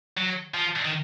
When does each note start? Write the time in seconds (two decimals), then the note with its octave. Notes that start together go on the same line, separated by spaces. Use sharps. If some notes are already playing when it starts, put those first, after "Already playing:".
0.17 F#3
0.54 F3
0.85 D#3